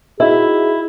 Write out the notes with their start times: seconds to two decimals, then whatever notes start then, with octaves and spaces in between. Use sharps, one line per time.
0.20 D#4 E4 F#4 G#4 E5